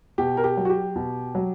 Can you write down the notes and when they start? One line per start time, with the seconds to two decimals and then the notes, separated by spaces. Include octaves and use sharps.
0.18 B2 G4
0.37 A#4
0.44 G4
0.57 F#3
0.65 F#4
0.70 G4
0.96 B2
1.35 F#3